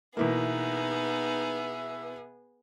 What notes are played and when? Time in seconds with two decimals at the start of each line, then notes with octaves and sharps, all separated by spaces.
0.17 B2 E3 A#3 B3 D#4 G#4 E5